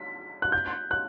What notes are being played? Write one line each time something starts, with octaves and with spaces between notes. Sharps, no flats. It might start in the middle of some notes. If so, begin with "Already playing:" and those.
Already playing: B6
F#6
G6
F#6